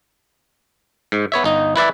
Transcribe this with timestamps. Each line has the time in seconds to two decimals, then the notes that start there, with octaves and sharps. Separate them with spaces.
1.12 G#2
1.32 B3 C#5 E5
1.44 G1 D#4
1.76 E4 B4 D5 E5